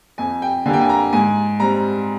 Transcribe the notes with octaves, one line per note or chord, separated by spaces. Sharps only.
F2 G#5
G5
D3 G3 A#3 G#5
G5
G#5
A#5
G#2 G#5
G3 C4 A#5